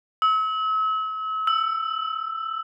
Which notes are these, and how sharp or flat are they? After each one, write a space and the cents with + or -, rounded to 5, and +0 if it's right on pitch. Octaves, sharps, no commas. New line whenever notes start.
E6 -40
E6 +10